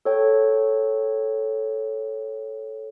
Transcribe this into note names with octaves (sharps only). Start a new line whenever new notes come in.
A4 C#5 G5